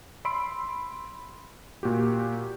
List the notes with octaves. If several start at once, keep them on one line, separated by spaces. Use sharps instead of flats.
B5 C6 E6 D7
A#2 F#4 G4